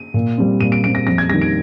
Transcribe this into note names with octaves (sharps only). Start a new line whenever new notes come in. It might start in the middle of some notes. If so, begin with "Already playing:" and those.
Already playing: D#7
A#2
G3 C4
A#2 D#7
D7
G3 C4 D7
A#6
F2 A#6
G#6
D#3 G3 A#6
D7